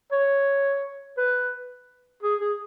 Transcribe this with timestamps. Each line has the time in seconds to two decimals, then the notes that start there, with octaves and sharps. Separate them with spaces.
0.12 C#5
1.18 B4
2.23 G#4
2.41 G#4